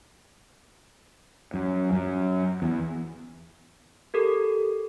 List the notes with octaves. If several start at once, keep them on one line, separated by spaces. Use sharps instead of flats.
F#2
F#2
E2
G4 A4 A#4